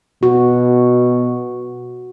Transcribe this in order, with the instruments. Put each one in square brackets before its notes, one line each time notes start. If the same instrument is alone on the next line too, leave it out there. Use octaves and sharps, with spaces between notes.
[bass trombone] B2 [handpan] F#4